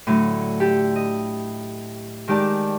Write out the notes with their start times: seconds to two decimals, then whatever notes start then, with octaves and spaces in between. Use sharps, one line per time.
0.07 A2 D3 F#3
0.60 G4 A4
0.96 D#5
2.28 D#3 G#3 G4 D5 A5